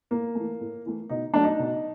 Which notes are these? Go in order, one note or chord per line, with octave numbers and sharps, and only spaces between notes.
A2 A#3
E3 A3
A2
E3 A3
B2 D#4
F#3 A3 D4
D#4
B2